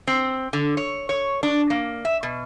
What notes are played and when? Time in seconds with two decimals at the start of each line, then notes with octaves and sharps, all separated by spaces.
0.07 C4
0.53 D3
0.77 C#5
1.09 C#5
1.43 D4
1.70 A#3
2.05 E5
2.23 B2